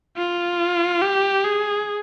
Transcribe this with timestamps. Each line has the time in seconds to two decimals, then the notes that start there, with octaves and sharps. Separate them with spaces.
0.17 F4
1.02 G4
1.44 G#4